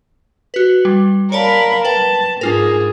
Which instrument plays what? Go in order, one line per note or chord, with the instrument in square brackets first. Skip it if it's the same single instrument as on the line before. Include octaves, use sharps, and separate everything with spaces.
[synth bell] F#4 B4
G3
[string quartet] A#4 F5 B5 [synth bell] C#5 D5 A5
[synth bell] B4 G5 [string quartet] A5
[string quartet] G#2 G#4 [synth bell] D4 F4 A#4